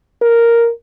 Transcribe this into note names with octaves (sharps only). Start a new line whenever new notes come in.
A#4